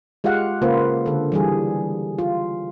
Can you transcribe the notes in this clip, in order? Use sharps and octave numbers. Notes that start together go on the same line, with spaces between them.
G#3 F4 G4 F5 F#5
C#3 A#3 F4 B4 C5
D3 A4
E3 G3 G#4
F4